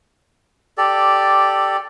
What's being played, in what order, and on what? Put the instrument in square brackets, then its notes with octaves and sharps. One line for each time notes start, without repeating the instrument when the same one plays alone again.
[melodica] G4 A4 D5